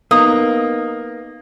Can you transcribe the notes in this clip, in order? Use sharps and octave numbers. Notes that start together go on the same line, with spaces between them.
A#3 B3 D#4 D#6